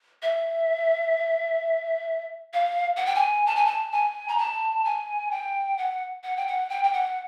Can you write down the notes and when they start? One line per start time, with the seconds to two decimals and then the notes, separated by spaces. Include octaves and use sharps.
0.23 E5
2.53 F5
2.97 F#5
3.06 G5
3.15 G#5
3.46 A5
3.56 G#5
3.66 A5
3.92 G#5
4.28 A#5
4.38 A5
4.85 G#5
5.31 G5
5.78 F#5
6.24 F#5
6.37 G5
6.47 F#5
6.70 G5
6.84 G5
6.93 F#5